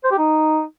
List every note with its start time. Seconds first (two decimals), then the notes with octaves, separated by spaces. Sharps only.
0.04 C5
0.11 G4
0.18 D#4